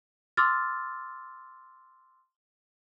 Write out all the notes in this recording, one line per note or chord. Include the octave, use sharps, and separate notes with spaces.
C6 D6 E6 F6 A6